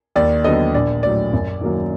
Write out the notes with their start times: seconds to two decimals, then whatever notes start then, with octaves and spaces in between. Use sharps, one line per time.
0.16 D#2 D5
0.44 D3 F#3 B3 D#5
0.75 A#1 D5
1.03 A2 F#3 D5
1.33 F#2
1.61 D#3 F#3 A#3